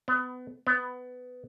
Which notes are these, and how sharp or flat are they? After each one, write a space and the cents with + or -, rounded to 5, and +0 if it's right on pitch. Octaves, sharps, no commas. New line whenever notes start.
B3 +30
B3 +20